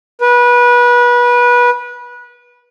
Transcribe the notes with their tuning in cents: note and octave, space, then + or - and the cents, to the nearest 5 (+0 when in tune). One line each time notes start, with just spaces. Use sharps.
B4 -25